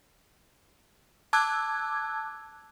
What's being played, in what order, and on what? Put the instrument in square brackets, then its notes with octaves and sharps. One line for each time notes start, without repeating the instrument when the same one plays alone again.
[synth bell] A5 D6 E6 F#6 G#6